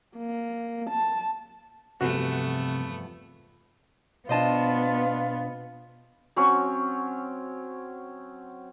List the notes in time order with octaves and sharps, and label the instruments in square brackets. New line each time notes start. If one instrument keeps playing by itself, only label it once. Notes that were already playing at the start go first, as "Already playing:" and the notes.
[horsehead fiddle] A#3
A5
[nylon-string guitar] E2 G2 F3 [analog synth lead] C3 [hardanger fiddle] A3 B3 [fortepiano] F#4
[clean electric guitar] B2 D4 [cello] B3 [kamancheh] F4 [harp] C5 D#5 A5
[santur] F#3 C4 C#4 C#5